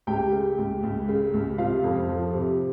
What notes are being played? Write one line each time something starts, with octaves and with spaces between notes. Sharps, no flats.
C#2 G4 G5
C#3
C#2
C#2
C#3
C#2
C3 F4 F5
F2
F3
C3